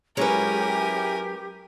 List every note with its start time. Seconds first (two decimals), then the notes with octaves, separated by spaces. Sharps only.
0.17 F#3 G#3 C#4 E4 G4 A#4 B4 G#5